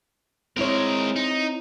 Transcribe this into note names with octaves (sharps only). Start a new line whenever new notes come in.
G#3 C4 E4 A#4 C#5
D#4